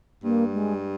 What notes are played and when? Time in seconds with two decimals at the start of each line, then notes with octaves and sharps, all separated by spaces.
0.23 G2 A#3
0.53 G#3